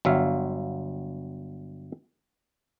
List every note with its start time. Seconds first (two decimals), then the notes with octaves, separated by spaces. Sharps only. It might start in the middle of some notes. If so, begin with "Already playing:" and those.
0.05 G1 F#3 E5 F5